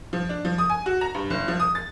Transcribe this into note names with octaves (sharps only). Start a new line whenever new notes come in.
F3
D4
F3
D#6
G#5
F#4
A#5
G2
F#1
F3
D#6
A6